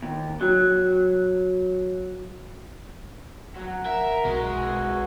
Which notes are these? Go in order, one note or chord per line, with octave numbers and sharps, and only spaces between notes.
D#2
F#3
F#3 F#5
A#4 E5
B1 G#3 F#4
G#4 B4